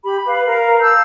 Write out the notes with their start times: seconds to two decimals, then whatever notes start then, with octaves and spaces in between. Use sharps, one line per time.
0.04 G4 B5
0.26 B4 F5
0.47 A#4 F5
0.81 F5 A5 E6 G6